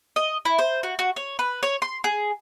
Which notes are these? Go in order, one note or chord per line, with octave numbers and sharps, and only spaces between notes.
D#5
E4
C5
F#4
F#4
C#5
B4
C#5
C6
G#4